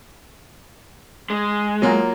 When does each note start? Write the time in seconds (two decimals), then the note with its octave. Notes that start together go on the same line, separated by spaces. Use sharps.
1.30 G#3
1.82 F#3 A#3 F4